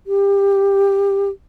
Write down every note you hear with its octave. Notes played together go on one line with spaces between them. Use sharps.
G4